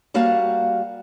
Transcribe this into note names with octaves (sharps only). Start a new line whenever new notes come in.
G3 A#3 F#4 F5 F#5 A5